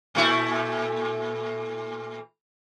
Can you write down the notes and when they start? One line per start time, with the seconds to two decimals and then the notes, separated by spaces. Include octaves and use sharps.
0.15 A#2 A3 E4